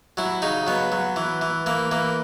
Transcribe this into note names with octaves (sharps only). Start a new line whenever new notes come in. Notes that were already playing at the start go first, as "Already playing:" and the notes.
F#3 E4
C#3 D#4
F#3 B3
F#3
E3
E3
E3 A#3
E3 A#3